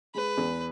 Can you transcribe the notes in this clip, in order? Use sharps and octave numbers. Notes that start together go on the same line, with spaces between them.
G#3 B4
E2